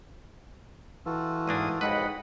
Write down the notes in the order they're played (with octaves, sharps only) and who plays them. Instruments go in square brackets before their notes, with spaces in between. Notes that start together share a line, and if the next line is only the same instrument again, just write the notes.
[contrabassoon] E3 [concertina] F4 F#4 A4
[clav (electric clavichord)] E2 A#3 D4 [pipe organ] G#2 D#6
[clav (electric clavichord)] B1 F2 B4 [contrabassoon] G#2 [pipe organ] D#5 F#5 B5